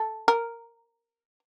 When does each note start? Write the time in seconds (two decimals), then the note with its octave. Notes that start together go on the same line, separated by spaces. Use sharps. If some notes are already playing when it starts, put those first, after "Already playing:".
Already playing: A4
0.28 A#4